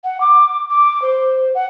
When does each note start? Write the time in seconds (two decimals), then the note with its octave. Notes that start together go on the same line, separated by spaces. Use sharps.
0.04 F#5
0.21 D6
0.70 D6
1.02 C5
1.55 F#5